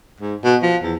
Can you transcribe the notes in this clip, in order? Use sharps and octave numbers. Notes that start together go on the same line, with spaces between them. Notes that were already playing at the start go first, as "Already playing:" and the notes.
G#2
B2
F3
E2